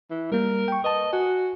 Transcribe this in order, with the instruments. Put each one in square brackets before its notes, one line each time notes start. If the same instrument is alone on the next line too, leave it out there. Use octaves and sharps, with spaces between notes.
[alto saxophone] E3
[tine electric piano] G3 A#3 [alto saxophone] A#4
[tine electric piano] G5 C#6
[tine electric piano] B4 A5 [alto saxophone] D#5
[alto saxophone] F#4 [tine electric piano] G#5